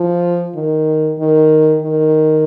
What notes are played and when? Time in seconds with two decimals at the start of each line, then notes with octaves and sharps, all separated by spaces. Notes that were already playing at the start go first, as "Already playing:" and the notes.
Already playing: F3
0.56 D#3
1.19 D#3
1.82 D#3